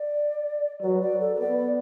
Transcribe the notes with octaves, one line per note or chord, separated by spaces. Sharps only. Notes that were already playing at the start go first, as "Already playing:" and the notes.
Already playing: D5
F#3 B4
D5
A4
B4
B3 D5